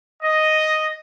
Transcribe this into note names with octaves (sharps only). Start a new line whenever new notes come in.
D#5